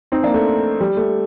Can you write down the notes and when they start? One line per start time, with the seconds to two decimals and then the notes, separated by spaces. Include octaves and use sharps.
0.12 C4 D#4
0.23 A#3 D4
0.34 A3
0.81 G3
0.97 A3